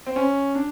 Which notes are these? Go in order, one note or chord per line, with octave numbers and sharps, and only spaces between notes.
C4
C#4
D4